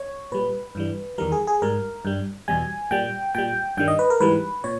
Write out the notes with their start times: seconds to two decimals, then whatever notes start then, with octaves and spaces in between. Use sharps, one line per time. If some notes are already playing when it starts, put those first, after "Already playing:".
Already playing: C#5
0.32 A#2 G3 B4
0.75 G2 E3 G3
1.18 E2 D#3 G3 A#4
1.32 G#4
1.47 G#4
1.62 G#2 G3 A#4
2.05 G2 G3
2.48 E2 B2 G3 G#5
2.91 A#2 G3 G5
3.35 A#2 G3 G5
3.77 G2 D#3 G3 G5
3.88 D#5
3.99 B4
4.10 A#4
4.20 G#2 E3 G3 B4
4.64 A#2 C#5